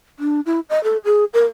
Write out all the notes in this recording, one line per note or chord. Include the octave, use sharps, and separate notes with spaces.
D4
E4
D#5
A4
G#4
A#4